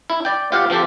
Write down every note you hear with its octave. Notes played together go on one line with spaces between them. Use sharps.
E4
D5 G5
F4 G4 C5 F5 F#5
F3 C4 G4 A4